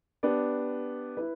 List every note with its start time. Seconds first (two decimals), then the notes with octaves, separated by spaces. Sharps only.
0.23 B3 D4 G4 D5
1.17 E4 B4